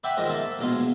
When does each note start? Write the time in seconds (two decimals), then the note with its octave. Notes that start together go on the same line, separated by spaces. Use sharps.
0.04 B4 D5 E5 F#5 G5 B5
0.17 G#2 D#3 F3 A#4 D#5
0.29 A#3 E5 A5
0.59 A#1 E2 B2 G#3 F5